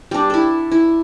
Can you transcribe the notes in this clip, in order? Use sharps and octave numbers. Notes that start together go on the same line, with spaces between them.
G3 D4
E4 A4
E4